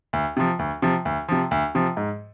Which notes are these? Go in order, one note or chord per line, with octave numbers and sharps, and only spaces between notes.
D2
C3 F3
D2
C3 F3
D2
C3 F3
D2
C3 F3
G#2